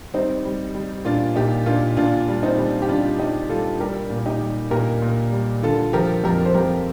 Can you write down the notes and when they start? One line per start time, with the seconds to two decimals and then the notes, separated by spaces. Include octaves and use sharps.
0.14 G3 C4 D#4
0.45 G3
0.75 G3
1.05 A#2 D4 F4
1.36 A#2 D#4 G4
1.66 A#2 D4 F4
1.97 A#2 D4 F4
2.28 G3
2.43 C4 D#4
2.58 G3
2.82 G4
2.89 G3 D4 F4
3.19 G3 D#4 G4
3.50 G3 F4 A4
3.80 G3 G4 A#4
4.10 A#2
4.26 D#4 G4
4.41 G3
4.71 A#2 G4 A#4
5.02 A#2
5.32 G3
5.63 D3 F4 A4
5.93 F3 G4 A#4
6.24 F2 G4 A#4
6.46 C5
6.55 F2 G4 A#4